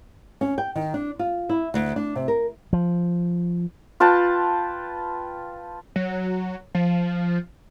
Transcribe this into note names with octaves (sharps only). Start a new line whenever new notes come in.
C#4
G5
D#3
D4
F4
E4
D2
D4
C3
A#4
F3
F4 B4 G5 A5
F#3
F3